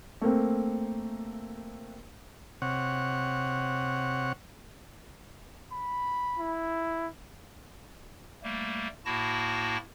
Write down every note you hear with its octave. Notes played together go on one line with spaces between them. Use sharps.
A3 A#3 C4
C3 C#5 F#5
B5
E4
G3 A3 A#3
A2 A#3 E4 F#4 A5 A#6